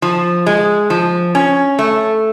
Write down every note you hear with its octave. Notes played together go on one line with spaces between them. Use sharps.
F3
G#3
F3
C#4
A3